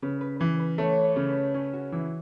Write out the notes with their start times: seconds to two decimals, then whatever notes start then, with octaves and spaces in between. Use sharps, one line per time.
0.02 C#3 B4
0.21 B4
0.40 E3 B4
0.59 B4
0.78 A3 C#5
1.04 C#5
1.16 C#3
1.29 B4
1.54 C#4 G#4
1.73 F#4
1.92 E3 E4